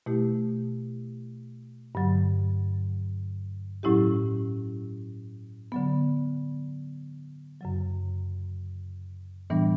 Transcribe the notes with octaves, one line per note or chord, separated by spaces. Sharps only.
B2 A3 E4 G4
G2 D3 F#3
A2 F#3 C#4 E4 G4
D3 F#3 B3
F#2 C#3 F#3
A2 E3 G3 B3 D4